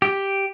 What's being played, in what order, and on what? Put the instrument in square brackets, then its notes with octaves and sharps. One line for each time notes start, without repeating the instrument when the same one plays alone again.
[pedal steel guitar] G4